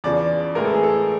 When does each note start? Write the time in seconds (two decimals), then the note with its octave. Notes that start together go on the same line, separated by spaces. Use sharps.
0.04 E2 C#3 F3 D5
0.55 A2 E3 G#3 A#4
0.65 A4
0.74 G#4
0.83 A4